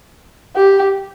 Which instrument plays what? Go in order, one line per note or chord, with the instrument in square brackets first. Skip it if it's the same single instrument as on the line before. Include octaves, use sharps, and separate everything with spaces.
[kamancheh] G4